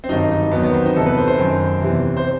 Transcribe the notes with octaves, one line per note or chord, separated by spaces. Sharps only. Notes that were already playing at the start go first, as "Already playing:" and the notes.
C4
G2 D#3 F#3 D#4
D#4
E2 D#3 F#3 B3
B3
C4
D#4
E2 C3 E3 A4
B4
C5
C5
F#2 D#3 F#3
E2 C3 E3
C5